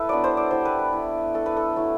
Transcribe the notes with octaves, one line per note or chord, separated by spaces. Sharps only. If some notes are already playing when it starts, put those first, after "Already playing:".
Already playing: E4 A4 B4
F#3 B3 D4 D5
C5
D5
G3 B3 E4 C5
B4
B4
A3 E4
A3 D4 A4
B4
A4
F#3 A3 E4